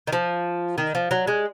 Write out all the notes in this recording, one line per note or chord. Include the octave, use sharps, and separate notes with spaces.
D#3
F3
D#3
F3
F#3
G#3